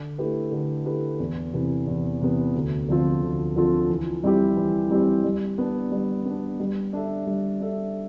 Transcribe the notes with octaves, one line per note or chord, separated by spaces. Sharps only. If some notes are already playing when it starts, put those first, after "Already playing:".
Already playing: D3
A3 E4 G4 B4
D3
A3 E4 G4 B4
E2
C3 E3 B3
E2
C3 E3 B3
D2
D3 F3 C4 F4
D2
D3 F3 C4 F4
E3
G3 C4 E4 G4
E3
G3 C4 E4 G4
G3
B3 D4
G3
B3 D4
G3
D4 A4 E5
G3
D4 A4 E5